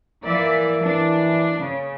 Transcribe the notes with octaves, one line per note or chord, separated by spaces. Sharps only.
E3 A#3 D5 E5
E3 D4
C#3